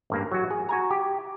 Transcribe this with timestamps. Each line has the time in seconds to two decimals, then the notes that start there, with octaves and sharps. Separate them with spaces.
0.10 A1 G2 A#3
0.32 F#3 F#4
0.51 G#4
0.69 F#4 G#5 A#5
0.91 G4